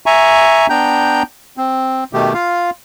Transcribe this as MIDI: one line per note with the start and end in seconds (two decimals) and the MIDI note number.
0.06 0.67 76
0.06 0.67 80
0.06 0.67 82
0.06 0.67 85
0.70 1.23 59
0.70 1.23 62
0.70 1.23 79
0.70 1.23 82
0.70 1.23 91
1.57 2.04 60
2.13 2.33 47
2.13 2.33 51
2.13 2.33 57
2.13 2.33 67
2.34 2.70 65
2.34 2.70 77